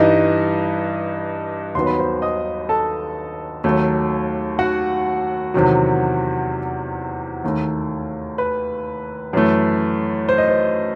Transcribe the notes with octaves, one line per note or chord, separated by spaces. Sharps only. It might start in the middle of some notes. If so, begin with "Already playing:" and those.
Already playing: G2 E3 G3 D#4 D#5
D#2 D#3 F#3 B3 C6
B5
C5 C6
D#5 D#6
A4 A5
D#2 D#3 F#3 A3
F#4 F#5
E2 C3 D#3 F#3
D#2 D#3 A3
B4
F#2 E3 A3
C5
D#5
C5